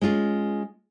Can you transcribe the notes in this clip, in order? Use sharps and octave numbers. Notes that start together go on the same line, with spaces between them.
G#3 C#4 F4 G#4